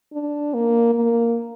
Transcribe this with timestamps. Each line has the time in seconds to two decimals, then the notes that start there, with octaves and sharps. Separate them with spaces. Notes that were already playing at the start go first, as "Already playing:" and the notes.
0.13 D4
0.54 A#3
0.95 A#3